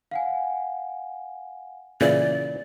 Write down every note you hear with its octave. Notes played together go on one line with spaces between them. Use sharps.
F5 F#5 G#5
A#2 C#3 E3 D5